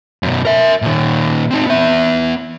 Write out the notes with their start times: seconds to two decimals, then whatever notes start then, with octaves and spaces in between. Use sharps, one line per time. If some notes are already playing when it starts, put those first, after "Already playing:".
0.23 F#2 B2
0.45 A#4 E5
0.82 A#2 D#3
1.51 C4 D#4
1.67 B3 E5